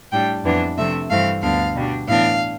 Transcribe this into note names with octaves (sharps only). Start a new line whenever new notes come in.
A2 G3 D4 G5
F2 E3 B3 D4
C3 F3 A3 D4 E5
G2 E3 A3 C4 F5
D2 D3 G3 B3 D4 F5
B2 G3 D4
A2 E3 B3 D4 F5